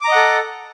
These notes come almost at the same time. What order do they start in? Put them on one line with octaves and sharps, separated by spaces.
D6 A#5 D#5 F#5 A4